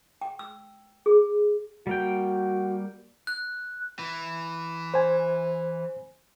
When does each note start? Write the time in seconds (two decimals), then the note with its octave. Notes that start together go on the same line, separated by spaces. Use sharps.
0.21 G5
0.39 E6
1.06 G#4
1.87 G3 A#3 F#4 G5
3.27 F#6
3.99 E3
4.94 C5 G#5